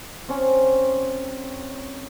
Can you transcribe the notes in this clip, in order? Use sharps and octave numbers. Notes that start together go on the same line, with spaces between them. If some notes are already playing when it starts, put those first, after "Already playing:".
C4 C#4 C#5